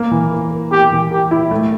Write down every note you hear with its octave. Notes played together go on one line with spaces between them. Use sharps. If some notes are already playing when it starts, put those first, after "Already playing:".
Already playing: A#3
E3
A#4
A#4
A#3 G4
E3
G4 A#4
E4
A3